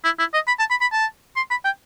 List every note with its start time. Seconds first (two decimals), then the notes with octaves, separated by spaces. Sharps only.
0.04 E4
0.19 E4
0.34 D#5
0.47 B5
0.59 A5
0.70 B5
0.81 B5
0.92 A5
1.36 C6
1.50 B5
1.64 G5